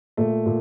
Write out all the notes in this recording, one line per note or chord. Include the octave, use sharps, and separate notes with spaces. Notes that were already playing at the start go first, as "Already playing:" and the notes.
A#2 A3
A#2